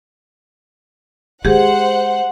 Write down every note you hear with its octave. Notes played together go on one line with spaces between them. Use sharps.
G#3 G4 G#4 C5 F#5